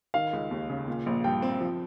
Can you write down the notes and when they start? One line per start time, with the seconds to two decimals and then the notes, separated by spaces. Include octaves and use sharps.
0.14 D#3 F5
0.33 C#2
0.51 D#2
0.70 C#3
0.88 A#2
1.06 A#1
1.24 G2 G5
1.42 C4
1.61 F3